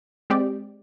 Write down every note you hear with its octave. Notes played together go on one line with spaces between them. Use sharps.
G#3 C4 G4 D5